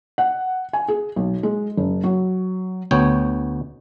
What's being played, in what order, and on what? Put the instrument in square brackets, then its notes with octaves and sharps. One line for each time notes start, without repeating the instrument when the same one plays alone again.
[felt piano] F#5
G#5
G#4
B1
G#3
F#1
F#3
[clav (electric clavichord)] D2 B3 C#5 G5